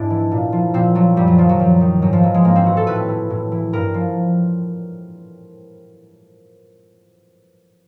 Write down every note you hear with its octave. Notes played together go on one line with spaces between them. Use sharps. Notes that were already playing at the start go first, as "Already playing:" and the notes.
Already playing: G#2 D4 E4
E3
A#2
F3
A#2 C4
F3 F#3
F#2 G3
F#3
D#3 F3
F#3
F#2
D#3
G#2 F#3
F3
E3 F#3
G#3
G#2 A#3
C4
E3 F#4
A4
A2 B4
E3
A2
E3
G2 A#4
F3